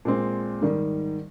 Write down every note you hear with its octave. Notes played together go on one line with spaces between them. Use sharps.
A#2 G#3 C4
G#2 D#3 G3